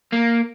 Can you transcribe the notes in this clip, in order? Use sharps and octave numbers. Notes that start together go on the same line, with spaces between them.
A#3